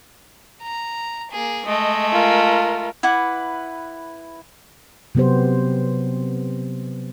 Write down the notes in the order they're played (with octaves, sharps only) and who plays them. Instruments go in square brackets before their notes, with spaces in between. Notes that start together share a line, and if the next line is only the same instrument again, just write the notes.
[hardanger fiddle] A#5
A#3 G#4
[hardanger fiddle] G#3 A3 [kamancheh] D#5
[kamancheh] F4 A#4
[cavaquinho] E4 B4 F#5 D6
[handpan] C3 F#3 B3 G4 C5